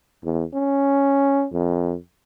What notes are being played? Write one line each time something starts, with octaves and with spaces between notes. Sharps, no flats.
E2
C#4
F2